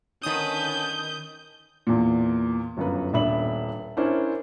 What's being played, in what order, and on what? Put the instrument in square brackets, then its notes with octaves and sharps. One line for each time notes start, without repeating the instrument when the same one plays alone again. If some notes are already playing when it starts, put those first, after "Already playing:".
[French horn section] D3 C#4 [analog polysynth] D#3 D#6 [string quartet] B4 A5 [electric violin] G6
[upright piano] E2 A#2
G1 F#2 B4
D#1 B3 D4 E5 B5 F#7
C#4 D4 E4 A#4 C5